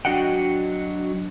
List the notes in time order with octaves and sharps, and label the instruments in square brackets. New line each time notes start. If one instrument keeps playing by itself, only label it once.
[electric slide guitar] F#3 D4 F#4 D#5 F#5 G5